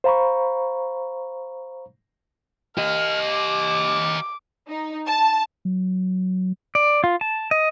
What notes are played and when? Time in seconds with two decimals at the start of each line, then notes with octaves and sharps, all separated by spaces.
0.04 C5 F5 A#5 B5 C#6
2.78 G4 D#5 F6
3.24 D6
4.68 D#4
5.07 A5
5.65 F#3
6.75 D5
7.04 F4
7.21 A5
7.51 D#5